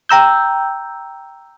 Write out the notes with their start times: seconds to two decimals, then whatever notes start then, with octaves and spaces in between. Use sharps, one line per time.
0.09 G5 A#5 E6 G6